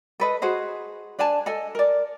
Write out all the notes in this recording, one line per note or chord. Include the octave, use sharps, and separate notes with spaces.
A4 B4 D#5
F#4 G#4 C5 D#5
D4 D5 G#5 A5
A4 D#5 G#5
A#4 D5